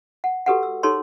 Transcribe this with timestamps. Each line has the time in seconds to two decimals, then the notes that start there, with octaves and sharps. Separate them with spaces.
0.24 F#5
0.46 F#4 G4 A4 B4 D5 F#5
0.63 E6
0.83 D#4 G4 A4 A#4 C#5 C6